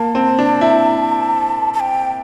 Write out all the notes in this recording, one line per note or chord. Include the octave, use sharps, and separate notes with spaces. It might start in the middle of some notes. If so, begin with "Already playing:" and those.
Already playing: A#3 A5
C4
D4
E4
A5
G5